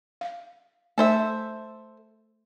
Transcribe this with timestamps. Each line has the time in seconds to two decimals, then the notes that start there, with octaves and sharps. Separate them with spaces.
0.21 F5
0.98 A3 A4 C5 E5